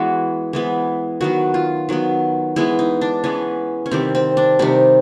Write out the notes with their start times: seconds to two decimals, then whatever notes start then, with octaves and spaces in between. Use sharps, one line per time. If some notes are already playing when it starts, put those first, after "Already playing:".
Already playing: E3 G#3 B3 F#4
0.53 E3 G#3 B3
1.21 D#3 F#3 B3 F#4
1.54 F4
1.89 D#3 F#3 B3
2.56 E3 G#3 B3 E4
2.79 D#4
3.01 D4
3.24 E3 G#3 B3 C#4
3.86 C#4
3.91 C3 D#3 G3 C4
4.15 C4
4.37 D4
4.59 C3 D#3 G3 D#4